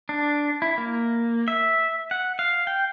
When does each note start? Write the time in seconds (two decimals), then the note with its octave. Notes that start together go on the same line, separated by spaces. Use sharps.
0.09 D4
0.62 E4
0.78 A#3
1.48 E5
2.11 F#5
2.39 F5
2.67 G5